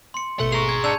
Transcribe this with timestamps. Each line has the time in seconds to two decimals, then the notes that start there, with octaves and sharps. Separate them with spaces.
0.14 C6 C#7
0.40 G#1 B2 A3 F#5
0.52 G#4 A#5 C#6 F7
0.69 G#6
0.84 D4 A5 E6 G6 G#6 C#7 F7